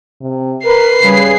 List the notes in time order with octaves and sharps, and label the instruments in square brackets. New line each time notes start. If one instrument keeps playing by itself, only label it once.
[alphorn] C3
[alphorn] A#4 [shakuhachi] B4 [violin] C7
[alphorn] C#3 [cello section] G3 G#4